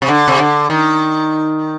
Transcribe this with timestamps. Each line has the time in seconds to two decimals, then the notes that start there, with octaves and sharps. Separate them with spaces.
0.02 C3
0.08 D3
0.28 C3
0.39 D3
0.70 D#3